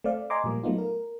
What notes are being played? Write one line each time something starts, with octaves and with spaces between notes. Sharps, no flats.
A3 C4 D5 F5
D#5 G#5 A#5 C6 D6
A#2 F3 G3 A3 A#3
F#3 A3 B3 D#4 F4
A#4